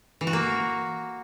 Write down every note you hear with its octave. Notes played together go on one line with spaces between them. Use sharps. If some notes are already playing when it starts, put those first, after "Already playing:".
E3
F#4
A#3